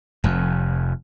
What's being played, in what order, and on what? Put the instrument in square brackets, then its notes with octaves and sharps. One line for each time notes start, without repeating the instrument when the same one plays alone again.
[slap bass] F1 F2